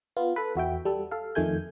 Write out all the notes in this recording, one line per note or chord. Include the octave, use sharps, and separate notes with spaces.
B3 F4
A4 B4
E2 F#4 E5 G5
G3 A4
A4 F5
F2 D#3 A3 G#5 G6